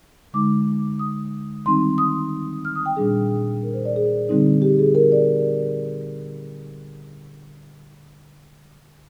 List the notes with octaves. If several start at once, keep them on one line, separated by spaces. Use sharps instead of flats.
D3 G#3 D#4 D6
D#6
D#3 G3 C4 D#4 C6
D#6
F6
D#6
G5
A#2 G3 D4 G#4
A#4
C5
D5
G#4
D3 G3 C4 D#4
G4
G#4
A#4
D5